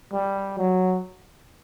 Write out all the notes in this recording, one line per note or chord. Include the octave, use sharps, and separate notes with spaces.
G3
F#3